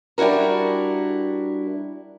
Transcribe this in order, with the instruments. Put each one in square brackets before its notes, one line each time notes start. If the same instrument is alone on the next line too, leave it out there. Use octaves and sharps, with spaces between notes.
[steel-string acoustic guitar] G3 D4 E4 F#4 A#4